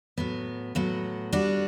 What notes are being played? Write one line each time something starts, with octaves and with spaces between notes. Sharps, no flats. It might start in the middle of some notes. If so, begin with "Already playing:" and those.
A2 F#3 B3
A2 F#3 B3
G3 D4 F#4